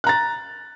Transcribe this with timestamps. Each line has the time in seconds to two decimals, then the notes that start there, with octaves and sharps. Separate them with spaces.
0.04 F#6
0.07 A#5
0.09 A6